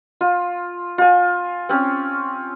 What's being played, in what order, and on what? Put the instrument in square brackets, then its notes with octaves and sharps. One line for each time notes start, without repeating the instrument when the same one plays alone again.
[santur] F4
F4 G#5
C4 C#4